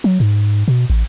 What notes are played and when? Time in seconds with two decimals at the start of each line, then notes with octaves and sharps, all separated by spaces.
0.04 F#3
0.20 G#2
0.68 B2
0.90 A1